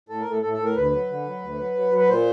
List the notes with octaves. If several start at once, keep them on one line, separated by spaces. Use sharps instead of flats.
A2 A4
A#4
A2
A4
A2 A4
A4
A2
A#4
D2 B4
F#3
D3
F#3
D2
F#3
F#3
F#3
B4
A#2 C5